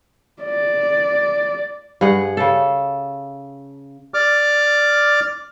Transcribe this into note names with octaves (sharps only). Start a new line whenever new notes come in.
D5
G2 G#4 F#5
C#3 A4
D5 D6 F6